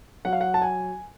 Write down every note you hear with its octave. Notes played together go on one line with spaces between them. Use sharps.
F#3 F#5
F5
F#5
A5
G#5